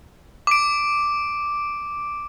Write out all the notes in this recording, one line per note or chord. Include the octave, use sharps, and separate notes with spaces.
D6 D7